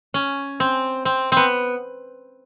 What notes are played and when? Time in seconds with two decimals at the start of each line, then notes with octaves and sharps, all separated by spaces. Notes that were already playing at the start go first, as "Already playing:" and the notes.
0.14 C#4
0.60 C4
1.05 C4
1.32 B3 C4